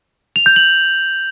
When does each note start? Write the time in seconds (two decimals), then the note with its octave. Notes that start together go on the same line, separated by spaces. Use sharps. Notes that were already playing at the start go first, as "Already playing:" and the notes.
0.36 F7
0.46 G6
0.56 F#7